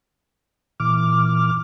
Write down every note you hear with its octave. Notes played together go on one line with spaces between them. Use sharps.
A#2 E3 D6 F6